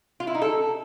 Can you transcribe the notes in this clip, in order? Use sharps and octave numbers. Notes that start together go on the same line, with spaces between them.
F4
E4
D#4
A4